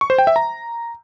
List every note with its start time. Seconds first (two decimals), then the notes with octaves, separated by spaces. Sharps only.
0.01 C#6
0.10 C5
0.18 G5
0.27 E5
0.36 A#5